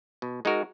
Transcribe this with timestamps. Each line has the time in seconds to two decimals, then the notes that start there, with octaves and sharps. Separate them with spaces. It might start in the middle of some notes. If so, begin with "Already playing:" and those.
0.22 B2
0.45 G#3 D#4 F#4 A#4